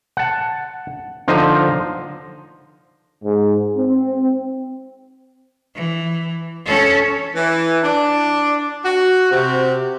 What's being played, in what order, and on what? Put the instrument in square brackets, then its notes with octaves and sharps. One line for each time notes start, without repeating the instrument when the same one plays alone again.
[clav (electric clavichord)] F#5 A5
D3 F3 D#4 C5 D#5 A#5
[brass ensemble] G#2
C4
[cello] E3
C#4 A4
[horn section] E3
D4
F#4
C3